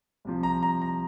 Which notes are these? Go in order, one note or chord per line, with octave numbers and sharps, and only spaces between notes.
C2 C3 F3
A#5
A#5
A#5